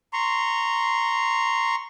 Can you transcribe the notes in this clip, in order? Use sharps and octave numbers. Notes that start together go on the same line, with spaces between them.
A#5 C6 C#6